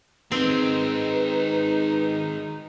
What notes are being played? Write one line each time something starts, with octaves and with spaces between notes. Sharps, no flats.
D#3 G#3 C4 D#4 B4